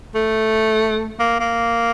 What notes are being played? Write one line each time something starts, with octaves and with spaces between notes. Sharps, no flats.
A3
A#3
A#3